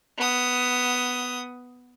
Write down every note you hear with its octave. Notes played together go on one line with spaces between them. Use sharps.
B3 D#6